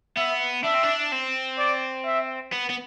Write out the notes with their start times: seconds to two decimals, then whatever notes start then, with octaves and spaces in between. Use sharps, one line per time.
0.17 B3 E5
0.64 D4 E5
0.74 C4
0.83 D4
1.12 C4
1.58 D5
2.05 E5
2.52 B3
2.70 B3